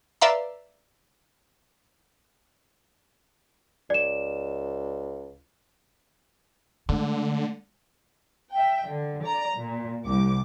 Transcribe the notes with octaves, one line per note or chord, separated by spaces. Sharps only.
B4 D5 E5 F5 A#5 C6
C#2 D5 E7
D3 G#3 A3
E5 G5
D3
D5 A#5
A#2
C2 D6